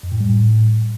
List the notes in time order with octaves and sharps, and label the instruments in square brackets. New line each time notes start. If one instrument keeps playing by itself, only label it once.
[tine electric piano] F2
A2
G3
A2